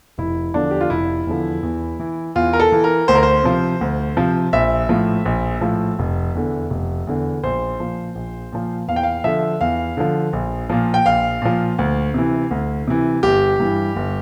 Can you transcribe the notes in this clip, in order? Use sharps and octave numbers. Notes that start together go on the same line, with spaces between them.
F1 E4
E2 D3 F3 D4
G4
F4
F1 E4
E2 D3 F3
E2
E3
E2 F4
A#4
A4
E3
A#4
D2 C5
A#4
C5
C3 F3
D2
C3 F3
A#1 E5
A2 F3
A#1
A2 F3
F1
E2 D3
F1
E2 D3
A#1 C5
A#2 F3
A#1
A#2 F3
E2 F5
G5
F5
D3 F3 E5
E2 F5
D3 F3
A#1
A#2 F3
G5
A#1 F5
A#2 F3
D2
C3 E3
D2
C3 E3
G1 G4
G2 E3
G1